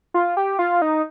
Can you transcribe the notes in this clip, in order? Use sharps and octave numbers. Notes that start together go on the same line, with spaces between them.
F4
G4
F4
D#4